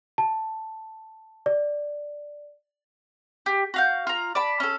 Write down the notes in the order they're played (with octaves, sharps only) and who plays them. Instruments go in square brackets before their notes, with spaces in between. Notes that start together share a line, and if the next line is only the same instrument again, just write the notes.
[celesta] A5
D5
[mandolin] G4
F#4 F5 G6
F4 A#5
D5 A5 B5
C#4 A4